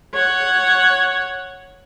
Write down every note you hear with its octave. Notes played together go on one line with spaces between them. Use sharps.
C#5 F#5